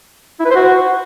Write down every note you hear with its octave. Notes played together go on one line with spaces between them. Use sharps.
E4
B4
C5
F#4